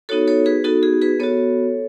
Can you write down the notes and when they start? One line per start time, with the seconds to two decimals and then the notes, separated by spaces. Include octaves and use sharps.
0.09 B3 D#4 F#4 A4 C#5
0.28 A4 C#5
0.46 G#4 B4
0.64 B3 D#4 F#4 A4
0.83 G#4
1.02 G#4 B4
1.20 B3 F#4 A4 C#5